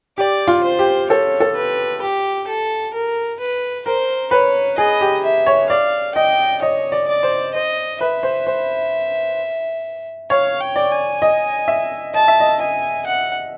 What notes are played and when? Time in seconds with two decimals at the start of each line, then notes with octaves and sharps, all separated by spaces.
0.18 G4 D5
0.48 F4
0.63 C5
0.79 G4
1.10 A4 C#5
1.40 A4
1.56 B4
2.02 G4
2.48 A4
2.94 A#4
3.40 B4
3.86 A#4 C5
4.31 B4 C#5
4.78 G#4 D#5
5.01 G4
5.24 E5
5.46 C#5
5.70 D5 F5
6.15 D#5 G5
6.62 C#5 D#5
6.92 D5
7.08 D5
7.23 C5
7.54 C5 D#5
8.01 B4 E5
8.23 C5
8.47 C5
10.30 C#5 F5
10.61 G5
10.76 D5
10.91 G#5
11.22 D#5
11.68 E5
12.14 D#5 A5
12.28 E5
12.40 D#5
12.60 D#5 G#5
13.07 F#5